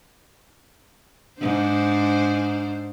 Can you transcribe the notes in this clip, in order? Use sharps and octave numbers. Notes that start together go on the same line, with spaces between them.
G#2 D4 C5